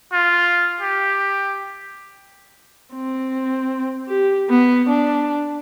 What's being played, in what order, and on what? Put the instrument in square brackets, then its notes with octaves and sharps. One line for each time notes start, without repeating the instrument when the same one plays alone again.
[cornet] F4
G4
[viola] C4
G4
B3
D4